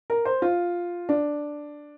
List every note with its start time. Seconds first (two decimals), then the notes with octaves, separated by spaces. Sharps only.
0.10 A#4
0.25 C5
0.42 F4
1.09 D4